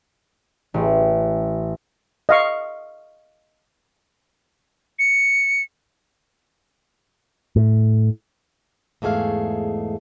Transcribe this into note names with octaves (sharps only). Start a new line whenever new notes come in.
A1
D#5 F5 C#6
C#7
A2
E2 G#2 A3 G#4 F5